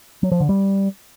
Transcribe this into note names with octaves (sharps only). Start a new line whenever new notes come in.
F#3
F3
D3
G3